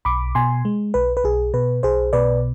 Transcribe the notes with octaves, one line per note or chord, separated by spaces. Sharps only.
B1 B5 D6
B2 G#5 C6
G#3
B1 B4
B4
B1 G#4
B2 B4
B1 G#4 C5
B2 B4 D5